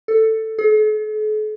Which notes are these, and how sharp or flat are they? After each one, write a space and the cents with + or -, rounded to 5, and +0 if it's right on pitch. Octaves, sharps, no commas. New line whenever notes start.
A4 +10
A4 -45